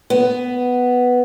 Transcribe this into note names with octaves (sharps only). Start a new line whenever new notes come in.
B3